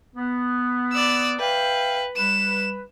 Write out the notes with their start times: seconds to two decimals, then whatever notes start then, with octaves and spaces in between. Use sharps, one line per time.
0.15 B3
0.93 D5 E6
1.39 B4 E5 F5 G5
2.17 G3 B4 E7